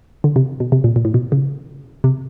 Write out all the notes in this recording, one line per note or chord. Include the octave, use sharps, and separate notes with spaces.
D3
C3
B2
C3
A#2
A#2
A2
B2
C#3
C3